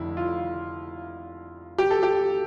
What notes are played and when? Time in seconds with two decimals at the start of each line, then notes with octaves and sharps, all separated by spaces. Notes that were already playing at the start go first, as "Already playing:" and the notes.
Already playing: F1 F2 D3 E4
0.17 F4
1.78 G4
1.91 A4
2.03 G4